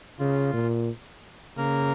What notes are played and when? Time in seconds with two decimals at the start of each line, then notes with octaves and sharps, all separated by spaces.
0.19 C#3 F4
0.53 A#2
1.57 C#3 A#3 A#4